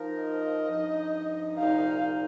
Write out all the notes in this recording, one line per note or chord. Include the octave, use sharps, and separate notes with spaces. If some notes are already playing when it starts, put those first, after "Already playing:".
Already playing: F3 D#4 A#4
D#5
G2 F3 D#4
C2 A#2 F3 D#4 F5